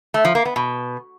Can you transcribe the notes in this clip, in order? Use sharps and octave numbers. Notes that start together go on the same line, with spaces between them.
A3
F3
A#3
B3
B2